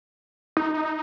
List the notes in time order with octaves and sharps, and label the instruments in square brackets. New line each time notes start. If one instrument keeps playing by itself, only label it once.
[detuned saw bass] D#4